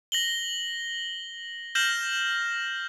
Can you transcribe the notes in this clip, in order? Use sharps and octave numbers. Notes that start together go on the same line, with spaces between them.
A#6 F#7 G7
F6 G6 A#6 C7 E7 F#7